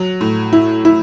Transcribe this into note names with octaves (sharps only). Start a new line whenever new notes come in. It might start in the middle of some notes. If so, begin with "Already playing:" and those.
Already playing: F#3
A2
E4
E4